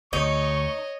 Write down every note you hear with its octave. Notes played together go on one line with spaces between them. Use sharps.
D2 D#4 C#5 D#5 C#6